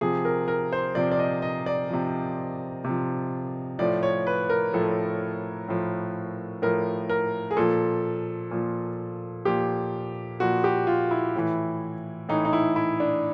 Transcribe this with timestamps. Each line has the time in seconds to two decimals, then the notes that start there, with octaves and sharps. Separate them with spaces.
0.01 C3 F3 G#4
0.25 A#4
0.48 A#4
0.73 C5
0.95 C3 F3 D5
1.11 D5
1.19 D#5
1.42 D#5
1.66 D5
1.90 C3 F3
2.84 C3 F3
3.79 A2 F3 D5
4.03 C#5
4.27 B4
4.50 A#4
4.73 A2 F3 A4
5.69 A2 F3
6.62 A2 F3 A#4
7.09 A#4
7.51 G#4
7.57 A#2 F3 A4
8.51 A#2 F3
9.45 A#2 F3 G4
10.40 A#2 F3 F#4
10.64 G4
10.87 F4
11.11 E4
11.35 A2 E3
12.29 A2 E3 D#4
12.45 D#4
12.53 E4
12.76 E4
13.00 D4